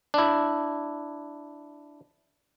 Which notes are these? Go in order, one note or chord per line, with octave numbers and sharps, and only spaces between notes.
D4 E4